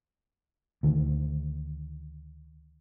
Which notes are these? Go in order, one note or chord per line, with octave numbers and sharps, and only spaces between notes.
D2 D#3